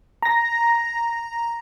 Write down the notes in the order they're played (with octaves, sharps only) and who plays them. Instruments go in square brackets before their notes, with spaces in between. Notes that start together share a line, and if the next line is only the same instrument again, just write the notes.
[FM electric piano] A#5 A#6